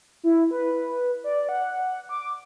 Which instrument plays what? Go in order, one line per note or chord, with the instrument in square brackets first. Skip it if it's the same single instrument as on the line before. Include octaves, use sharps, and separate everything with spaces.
[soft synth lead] E4
B4
D5
F#5
D6